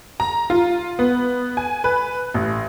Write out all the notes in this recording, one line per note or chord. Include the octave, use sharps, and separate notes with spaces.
A#5
F4
B3
G#5
B4
A1